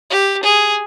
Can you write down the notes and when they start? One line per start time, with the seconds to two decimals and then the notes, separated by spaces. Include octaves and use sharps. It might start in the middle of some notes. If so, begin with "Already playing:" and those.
0.10 G4
0.44 G#4